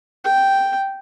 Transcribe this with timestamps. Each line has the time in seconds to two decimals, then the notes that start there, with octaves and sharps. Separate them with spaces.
0.24 G5